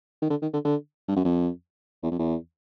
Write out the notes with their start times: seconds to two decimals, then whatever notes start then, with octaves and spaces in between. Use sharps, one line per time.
0.22 D#3
0.30 D3
0.42 D#3
0.53 D3
0.65 D3
1.08 G2
1.16 F#2
1.25 F2
2.03 E2
2.12 F2
2.19 E2